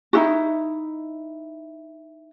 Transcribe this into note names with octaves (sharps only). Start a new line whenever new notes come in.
D#4 E4 F#4